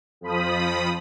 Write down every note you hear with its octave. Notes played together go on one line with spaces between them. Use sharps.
F2 F3 B5 D#6